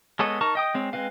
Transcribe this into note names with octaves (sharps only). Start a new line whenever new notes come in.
G#3 B3 A4 C#5 D#5
D#4 A#4 A5 C#6
D#5 G5 D#6
G#3 C4 C#5
G#3 C4 B4 F5